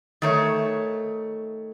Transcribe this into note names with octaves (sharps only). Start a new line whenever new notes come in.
D#3 A3 C#5